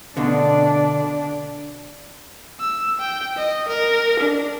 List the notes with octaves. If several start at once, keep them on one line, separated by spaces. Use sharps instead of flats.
B2 D3 D4
E6
G5
D#5
A#4
D4